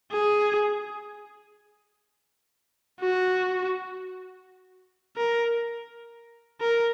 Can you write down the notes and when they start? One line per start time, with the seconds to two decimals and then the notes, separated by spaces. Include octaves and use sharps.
0.12 G#4
3.01 F#4
5.17 A#4
6.61 A#4